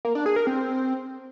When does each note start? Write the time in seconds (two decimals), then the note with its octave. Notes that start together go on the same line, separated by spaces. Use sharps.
0.05 A#3
0.15 D4
0.26 G#4
0.36 A#4
0.47 C4